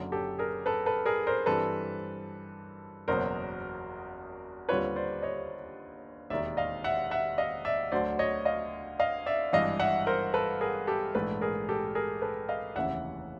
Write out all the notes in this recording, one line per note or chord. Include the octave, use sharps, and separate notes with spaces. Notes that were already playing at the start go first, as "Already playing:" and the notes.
Already playing: F#1 F#2 D3
G4 A4
G#4 A#4
A4 B4
A4 B4
G#4 A#4
A#4 C5
G2 E3 G3 C4 A4 B4
F#1 E2 B2 F#3 B3 A#4 C5
D#2 D3 G3 C4 F4 B4 C#5
C5 D5
C#5 D#5
E1 D#2 D#3 D5 E5
D#5 F5
E5 F#5
E5 F#5
D#5 F5
D5 E5
D2 D3 F#3 C5 D5
C#5 D#5
D#5 F5
D#5 F5
D5 E5
G#1 G2 E3 D#5 F5
E5 F#5
A#4 C5
A4 B4
G#4 A#4
G4 A4
A#1 G#2 E3 A3 A4 B4
G#4 A#4
G4 A4
G#4 A#4
A4 B4
D#5 F5
F1 D#2 C#3 E3 E5 F#5